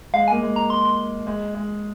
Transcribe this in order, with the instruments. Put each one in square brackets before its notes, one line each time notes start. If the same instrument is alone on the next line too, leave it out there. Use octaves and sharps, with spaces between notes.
[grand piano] G#3 [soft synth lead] F5
[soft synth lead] G#5
[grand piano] A#3
G#3
[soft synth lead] A#5
C6
[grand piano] G#3
G#3